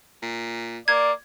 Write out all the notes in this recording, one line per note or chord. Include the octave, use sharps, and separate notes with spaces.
A#2
A#3 D5 G#6